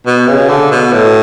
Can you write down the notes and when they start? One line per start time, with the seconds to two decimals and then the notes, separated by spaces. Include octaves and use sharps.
0.06 B2
0.27 C#3
0.49 D3
0.71 B2
0.93 A2